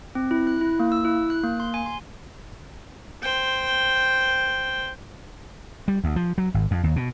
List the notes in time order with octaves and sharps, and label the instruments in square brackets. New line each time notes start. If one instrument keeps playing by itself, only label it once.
[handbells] C4
E4
F#6
E4
A#3
E6
E4
F#6
A#3
C6
G#5
C6
[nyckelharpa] C5 G5
[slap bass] G3
D2
F3
F#3
G#1
F2
D#2
B2